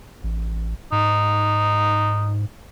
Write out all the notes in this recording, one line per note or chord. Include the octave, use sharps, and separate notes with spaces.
A1
G#2 D#4